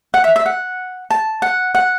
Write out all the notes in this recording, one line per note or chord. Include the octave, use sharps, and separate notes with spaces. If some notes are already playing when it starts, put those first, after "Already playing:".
F#5
E5
E5
F#5
A5
F#5
F#5